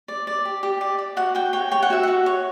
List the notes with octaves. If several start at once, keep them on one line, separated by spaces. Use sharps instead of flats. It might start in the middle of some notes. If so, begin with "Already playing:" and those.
D5
D5
G4
G4
D5
D5
F#4 F#5
F#4 G5
C#5 G5
C#5 G5
F#5
F#4 E5
F#4 F#5
C#5